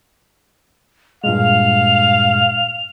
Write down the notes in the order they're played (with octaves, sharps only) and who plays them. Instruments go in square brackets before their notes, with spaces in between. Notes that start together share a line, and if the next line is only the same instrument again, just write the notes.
[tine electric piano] G2 A#2 G#3 [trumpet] F5 [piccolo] F7